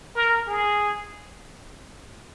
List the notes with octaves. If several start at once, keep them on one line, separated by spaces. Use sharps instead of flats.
A#4
G#4